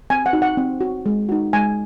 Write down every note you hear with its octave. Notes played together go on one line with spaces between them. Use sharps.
C4 G#5
F#5
D#4 F#4
F#5
C4
F#4
G#3
D#4 F#4
G#3 G#5